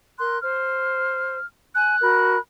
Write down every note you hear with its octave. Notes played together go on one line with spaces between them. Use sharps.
A#4 C6 F#6
C5 F6
G#5 F#6
F#4 A#4 B5